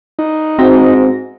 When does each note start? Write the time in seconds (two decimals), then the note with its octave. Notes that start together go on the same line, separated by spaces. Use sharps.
0.19 D#4
0.59 G#2 C4 F#4 E5 A#6